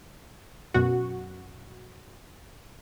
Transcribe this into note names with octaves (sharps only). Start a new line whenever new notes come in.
F#2 B2 F#4